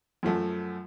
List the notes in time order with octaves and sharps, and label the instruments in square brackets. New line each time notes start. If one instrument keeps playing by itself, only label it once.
[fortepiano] F#2 F3 A3